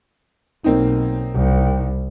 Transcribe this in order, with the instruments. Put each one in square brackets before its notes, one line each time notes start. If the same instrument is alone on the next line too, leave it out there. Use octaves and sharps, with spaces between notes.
[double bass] B1 [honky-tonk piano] A#3 C4 D#4
[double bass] C2